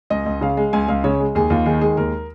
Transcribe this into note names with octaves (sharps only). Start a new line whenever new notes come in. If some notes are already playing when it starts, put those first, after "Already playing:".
C#2 D#5
C#2
C#3 F5
G#3
C#2 G#5
C#2 F5
C#3 C#5
G#3
D#2 G#4
D#2 F4
D#3 G#4
G#3 G#4
D#2 A#4